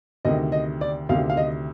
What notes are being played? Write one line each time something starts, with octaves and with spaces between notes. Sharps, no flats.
D2 C3 D#3 D#5
D#5
D5
D2 C3 D#3 F5
F5
D#5